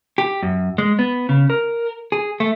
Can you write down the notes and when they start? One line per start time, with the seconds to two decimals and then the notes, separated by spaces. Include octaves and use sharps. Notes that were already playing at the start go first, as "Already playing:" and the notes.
0.18 G4
0.42 F#2
0.78 G#3
0.99 B3
1.29 C#3
1.50 A#4
2.12 G#4
2.40 A3